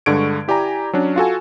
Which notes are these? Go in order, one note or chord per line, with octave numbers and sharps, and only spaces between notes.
G2 D3 G#3 C#6 G#6 D7
E4 G4 D5 G#5 A#5
F#3 C#4 D4
F4 F#4 A4 G#5